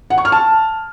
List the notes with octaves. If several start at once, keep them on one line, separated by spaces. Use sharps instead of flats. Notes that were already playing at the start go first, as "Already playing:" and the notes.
F#5
C#6
F6
A5